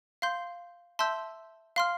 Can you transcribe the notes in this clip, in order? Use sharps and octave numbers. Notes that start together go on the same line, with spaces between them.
F5 C6 G6
E5 A5 C6 E6 G6
F5 C6 F6